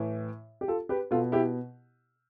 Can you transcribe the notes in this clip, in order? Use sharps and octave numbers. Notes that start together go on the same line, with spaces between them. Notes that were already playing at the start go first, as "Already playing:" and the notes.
Already playing: A2 E3
G4
F4 A4
G4 B4
B2 F4 A4
E4 G4